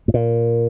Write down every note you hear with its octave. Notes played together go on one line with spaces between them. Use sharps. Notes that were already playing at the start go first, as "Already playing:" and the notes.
A2
A#2